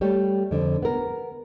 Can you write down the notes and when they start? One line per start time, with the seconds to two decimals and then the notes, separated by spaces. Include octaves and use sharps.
0.01 G3 A3 G4 C#5
0.51 F2 D3
0.82 B3 A#4